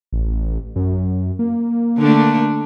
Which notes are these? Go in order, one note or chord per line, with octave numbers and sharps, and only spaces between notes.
A1
F#2
A#3
D3 A3 D4